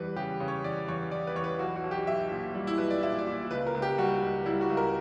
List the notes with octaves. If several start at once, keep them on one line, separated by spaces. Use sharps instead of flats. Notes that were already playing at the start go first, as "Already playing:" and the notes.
Already playing: E2 G3 B4
C#3 G4
C#3
C#5
E2 D5
E2 C#5
E2 D5
B4
E2 C#5
B4
B1 F#4
F#4
B1
G4
B1 E5
A#2
G3
E4
B1 B4
D5
A#2 E5
D5
A#2
C#2 B4
A#4
C#2
G4
G3 F#4
C#2
G3 E4
F#4
C#2
A#4